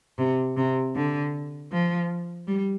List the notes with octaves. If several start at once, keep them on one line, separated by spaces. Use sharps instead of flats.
C3
C3
D3
F3
G3